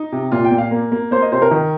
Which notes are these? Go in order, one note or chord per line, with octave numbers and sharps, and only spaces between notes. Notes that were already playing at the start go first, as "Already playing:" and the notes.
Already playing: D#4
C3
A#2 F4
G5
A#2
F5
A#3
A#3
A#3 C5
D#5
C3 C5
A#4
D#3